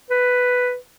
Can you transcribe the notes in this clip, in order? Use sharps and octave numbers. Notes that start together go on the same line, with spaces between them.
B4